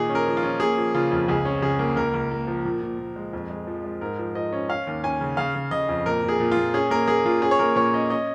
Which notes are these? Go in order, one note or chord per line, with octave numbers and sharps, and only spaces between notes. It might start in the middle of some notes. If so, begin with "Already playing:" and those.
Already playing: A#2 D#3 G#4
C#4
A#4
F3
F4
C#4
A#3 G#4
F3
C#3 F4
F2
C#2 G#4
C#4
C#3 G#4
A#3
C#2 A#4
C#2
A#3
F3
A#2
A#2
A#2
G#3
F2
G#3
F3
G#3
G#2 A#4
F3
F3 D#5
C#4
C#4 F5
D#2
C#4 G#5
C#3
C#3 F5
C#3
C#3 D#5
F2
A#2 A#4
A#2 G#4
A#2
A#2 F4
C#4 G#4
A#3 A#4
A#3 G#4
A#2 F4
C#4 G#4
C#5
A#3 A#4
A#2 C#5
C#4 D#5
C#4 D#5